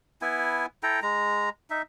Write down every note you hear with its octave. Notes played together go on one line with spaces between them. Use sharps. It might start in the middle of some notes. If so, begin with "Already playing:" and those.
B3 E4 G#5
E4 A4 G5 A#5
G#3 A#5
D#4 E5